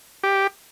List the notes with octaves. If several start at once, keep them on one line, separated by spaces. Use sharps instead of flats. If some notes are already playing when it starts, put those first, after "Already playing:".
G4